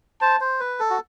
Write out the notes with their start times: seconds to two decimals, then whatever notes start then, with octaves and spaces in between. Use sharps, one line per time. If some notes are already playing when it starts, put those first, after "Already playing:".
0.21 C5 A5
0.40 C5
0.60 B4
0.80 A4
0.90 F#4